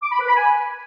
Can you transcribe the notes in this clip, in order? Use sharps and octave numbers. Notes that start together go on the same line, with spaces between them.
D6
B5
B4
B5
G#5